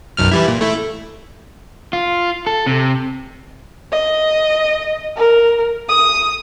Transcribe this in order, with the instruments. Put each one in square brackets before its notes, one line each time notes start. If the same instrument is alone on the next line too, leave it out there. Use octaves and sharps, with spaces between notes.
[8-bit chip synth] B1 F#2 F6
E3 G3 E4
A#2
A3 E4
[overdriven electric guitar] F4
A4
C3
[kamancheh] D#5
A#4
D#6